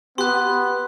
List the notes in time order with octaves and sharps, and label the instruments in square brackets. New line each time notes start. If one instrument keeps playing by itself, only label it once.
[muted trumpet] B3 [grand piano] G4 B4 [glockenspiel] C6 F#6